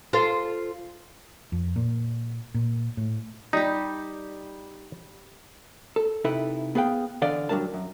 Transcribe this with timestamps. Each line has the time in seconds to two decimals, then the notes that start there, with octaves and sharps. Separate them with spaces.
0.13 F4 A4 C5
1.52 F2
1.76 A#2
2.54 A#2
2.97 A2
3.53 G3 D#4 G4
5.96 A4
6.24 C3 D#4 E4 A4 B4
6.75 B3 G#4 B4 F5 G5
7.22 D3 E3 D5 D#5 F5 F#5
7.49 F#3 G3 D4 A#4 A5
7.74 F#2